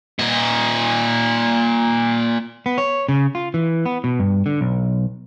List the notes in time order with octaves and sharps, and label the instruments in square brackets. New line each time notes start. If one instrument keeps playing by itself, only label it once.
[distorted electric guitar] A#2 D#5
[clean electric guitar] B3
C#5
C#3
F4
E3
B3
B2
G2
D3
B1